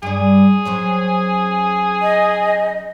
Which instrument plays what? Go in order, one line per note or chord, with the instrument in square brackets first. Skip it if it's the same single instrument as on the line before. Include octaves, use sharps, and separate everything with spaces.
[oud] G2 D5 [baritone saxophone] G#4
[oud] F#3 C4 C#4
[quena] D#5